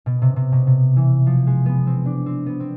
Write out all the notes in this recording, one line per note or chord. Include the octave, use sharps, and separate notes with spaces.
B2
C3
C3
B2
C3
E3
F3
G#3
B3
C4
D4
C4
B3
C4